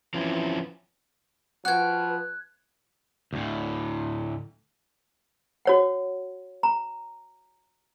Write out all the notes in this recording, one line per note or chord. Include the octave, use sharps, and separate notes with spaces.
E3 F3 C4 C#4
F3 F#4 B4 G5 F#6 G#6
D2 A2
F#4 C#5 F#5
A#5